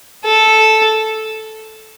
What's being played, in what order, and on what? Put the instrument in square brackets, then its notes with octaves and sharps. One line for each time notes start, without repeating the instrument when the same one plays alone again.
[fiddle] A4